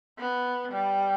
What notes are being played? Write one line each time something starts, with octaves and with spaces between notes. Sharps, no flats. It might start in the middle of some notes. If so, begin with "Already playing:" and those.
B3
G3